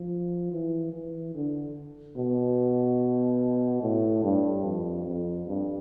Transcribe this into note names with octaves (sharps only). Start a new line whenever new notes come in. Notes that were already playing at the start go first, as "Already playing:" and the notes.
Already playing: F3
E3
E3
D3
B2
A2
G2
F2
F2
G2